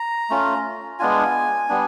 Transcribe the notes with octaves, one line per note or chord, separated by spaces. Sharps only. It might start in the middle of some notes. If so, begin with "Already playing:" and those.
Already playing: A#5
A3 C#4 F4
G#3 B3 D4 F4 G#5
G3 B3 D4